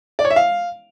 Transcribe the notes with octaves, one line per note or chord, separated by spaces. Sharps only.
D5
C#5
E5
F5